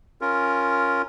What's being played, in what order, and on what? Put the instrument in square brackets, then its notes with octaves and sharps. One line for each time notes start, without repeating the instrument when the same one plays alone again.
[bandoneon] C#4 F4 A#4